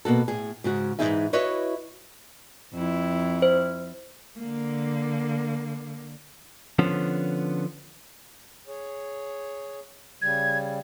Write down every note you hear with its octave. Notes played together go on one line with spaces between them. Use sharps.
B2 A#3 F#4 A4
A2 G#4
G#2 C#3 F#4
G#2 D#3 E3 D#4 G#4 E5
E4 F#4 B4 C#5 D#5 E5
F2 E4
C5
D3 A#3
D3 F3 B3 C#4
G#4 C#5
C#3 G3 G#6